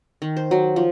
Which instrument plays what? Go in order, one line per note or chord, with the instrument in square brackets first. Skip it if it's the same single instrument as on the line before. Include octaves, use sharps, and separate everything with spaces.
[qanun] D#3
C5
F#3
F3